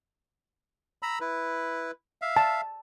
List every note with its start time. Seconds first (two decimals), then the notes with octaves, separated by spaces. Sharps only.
1.03 A#5 B5 E6
1.21 E4 B4
2.22 E5 F5
2.37 A5